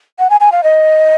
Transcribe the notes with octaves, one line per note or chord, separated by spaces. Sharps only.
F#5
G#5
G#5
F5
D#5